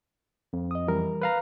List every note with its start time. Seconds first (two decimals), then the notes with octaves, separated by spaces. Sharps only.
0.53 F2
0.71 D#5 D#6
0.88 E3 G3 A#4
1.21 B4 F5 A#5